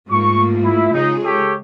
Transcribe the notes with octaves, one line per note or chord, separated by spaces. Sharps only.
G#2 A3 A#3 F4 C#6
E4
C#3 G#3 D#4 G#4
G4 A4 C#5